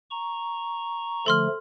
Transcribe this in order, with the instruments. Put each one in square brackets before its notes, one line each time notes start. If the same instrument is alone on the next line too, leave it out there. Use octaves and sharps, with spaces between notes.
[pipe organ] A#5 C#6
[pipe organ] D3 F3 A3 [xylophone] A4 C6 F6